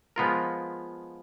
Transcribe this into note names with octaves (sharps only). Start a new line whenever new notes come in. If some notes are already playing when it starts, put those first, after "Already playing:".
F3 G#3 B3 F4 A#4